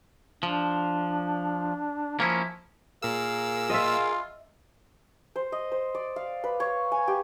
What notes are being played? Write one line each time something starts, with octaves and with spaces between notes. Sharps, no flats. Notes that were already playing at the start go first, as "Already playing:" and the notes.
F3 D4
F3 A#3 C#4 E4
A#2 G#4 A#4 F5 E6
F4 D#5 E5
C5
D#5
C5
D5
F5
B4
C#5
G#5
G4